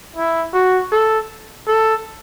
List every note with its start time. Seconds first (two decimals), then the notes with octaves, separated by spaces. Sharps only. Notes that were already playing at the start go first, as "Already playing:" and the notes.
0.16 E4
0.53 F#4
0.92 A4
1.68 A4